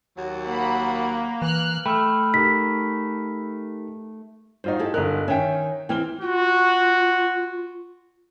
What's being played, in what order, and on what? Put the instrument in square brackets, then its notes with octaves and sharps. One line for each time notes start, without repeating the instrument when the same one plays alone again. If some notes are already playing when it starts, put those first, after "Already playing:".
[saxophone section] D#2 F#3
[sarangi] A#3 [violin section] F#5 B5
[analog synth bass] E3 [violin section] F6 F#6
[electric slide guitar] A3 [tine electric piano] G5 [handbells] B5 E6 F6
[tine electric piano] D#4 G4 A#4 [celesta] B6
[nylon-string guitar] G2 F#4 [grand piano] D#4 F4 C5
[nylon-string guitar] E4 G4 A4
[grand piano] G1 D#5 F#6 [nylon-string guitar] A#4
[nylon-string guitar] D#3 C#4 [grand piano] E5 G5
[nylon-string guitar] E3 C4 E4 [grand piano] G5 F6 G7
[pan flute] F4 [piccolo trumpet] F#4